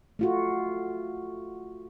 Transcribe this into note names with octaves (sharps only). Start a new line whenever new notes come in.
A3 F4 F#4